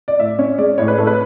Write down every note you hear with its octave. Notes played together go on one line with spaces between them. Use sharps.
D5
A2 E5
C#4 C#5
G#3 D5
A2 C#5
B4
A2 A4
B4